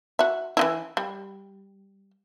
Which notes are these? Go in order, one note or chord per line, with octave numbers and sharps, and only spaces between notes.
F#4 E5
E3 D#4 E4
G3